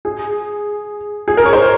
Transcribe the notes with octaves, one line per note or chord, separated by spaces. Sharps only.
G#4
G#4
A#4
C#5
C5